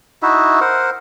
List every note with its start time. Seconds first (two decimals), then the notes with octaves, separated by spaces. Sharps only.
0.22 D#4 E4 F#4 E5
0.61 A#4 C5 F#5